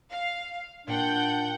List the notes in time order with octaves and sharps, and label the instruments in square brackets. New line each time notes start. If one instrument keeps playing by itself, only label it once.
[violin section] F5
[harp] A#2 [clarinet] D4 [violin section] F#5 G5 G6